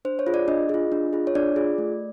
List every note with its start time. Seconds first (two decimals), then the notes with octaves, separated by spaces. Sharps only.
0.05 D4 C5
0.19 C#5
0.27 F4 G#4
0.34 D5
0.48 D4 D#5
0.69 F4 G#4
0.92 D4
1.13 F4 G#4
1.27 C#5
1.35 D4 D5
1.56 F4 G#4
1.78 A3